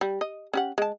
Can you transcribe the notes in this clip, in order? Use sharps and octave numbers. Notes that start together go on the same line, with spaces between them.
G3
D#5
C#4 G4 F#5
G#3 A5